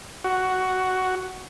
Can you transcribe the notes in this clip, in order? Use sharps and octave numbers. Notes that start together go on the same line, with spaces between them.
F#4